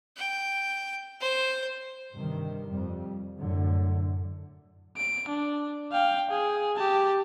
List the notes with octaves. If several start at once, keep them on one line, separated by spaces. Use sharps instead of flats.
G5
C5
G2 C3 D#3
F2 G3
F#2 A2 D3 F#3 A3
D7
D4
F5 G5
G#4
G4 A5